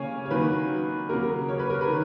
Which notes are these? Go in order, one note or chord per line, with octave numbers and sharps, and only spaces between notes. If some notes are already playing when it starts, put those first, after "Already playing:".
Already playing: C#3 A#3 C#5 F5 G#5
C#5
D#3 F#3 A#3 B4
C#3 F#3 A#3 A#4
C#5
B4
A#4
B4
D#3